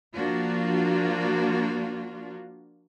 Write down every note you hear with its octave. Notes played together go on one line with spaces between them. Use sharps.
F3 A#3 D4 F4 F#4